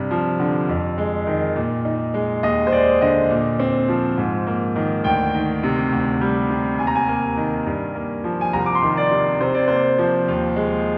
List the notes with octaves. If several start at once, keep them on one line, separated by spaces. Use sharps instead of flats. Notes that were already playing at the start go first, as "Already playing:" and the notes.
Already playing: G2 C3
F3
D3
F2
G#3
D#3
A#2
D#4
G#3
D#2 D#5
C5
G#3 D5
D3 D#5
A#2
C4
F3
G#2
A#3
D#3
D2 G5
D#3
C3
D2
G3
C3
D#2 G#5
A#5
G#5
A#3
D#3
G2
A#3
F3
G#5
C2 A#5
D6
C6
D#3
D5
C3
C3 C5
D5
A#3 C5
F3
D#2
G#3